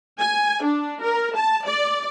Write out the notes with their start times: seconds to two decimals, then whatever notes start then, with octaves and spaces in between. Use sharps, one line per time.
0.19 G#5
0.64 D4
1.03 A#4
1.36 A5
1.66 D5